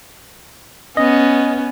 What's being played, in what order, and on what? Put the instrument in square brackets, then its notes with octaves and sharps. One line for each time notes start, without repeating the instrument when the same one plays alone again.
[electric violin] B3 C#4 [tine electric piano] D#5